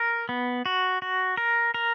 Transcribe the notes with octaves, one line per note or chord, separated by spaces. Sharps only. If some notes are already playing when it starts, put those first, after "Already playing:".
Already playing: A#4
B3
F#4
F#4
A#4
A#4